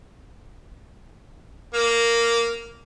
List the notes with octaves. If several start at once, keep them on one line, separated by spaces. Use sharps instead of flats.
A#3